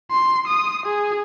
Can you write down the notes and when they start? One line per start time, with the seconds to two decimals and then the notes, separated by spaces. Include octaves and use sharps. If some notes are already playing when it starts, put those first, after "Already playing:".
0.11 C6
0.47 D#6
0.86 G#4